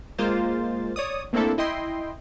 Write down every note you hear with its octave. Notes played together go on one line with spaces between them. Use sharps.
G#3 A#3 F4 C5 A6
C#5 D5 D#6
A3 A#3 C4 D4 E4 A4
E4 D#5 G5 C6